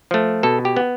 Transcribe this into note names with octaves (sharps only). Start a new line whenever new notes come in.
F3 A3
B2 A4
G4
B3